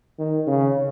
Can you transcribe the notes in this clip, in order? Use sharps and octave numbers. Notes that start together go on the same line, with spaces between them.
D#3
C#3